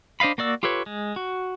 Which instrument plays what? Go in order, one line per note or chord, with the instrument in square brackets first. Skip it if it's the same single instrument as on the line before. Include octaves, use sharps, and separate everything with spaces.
[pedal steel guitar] D4 C5 D#5 F5 B5
A#3 F#4 D5 E6
F4 G4 A4 B4 C#5
G#3
F#4